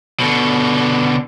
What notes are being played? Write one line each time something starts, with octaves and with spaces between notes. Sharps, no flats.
B2 D3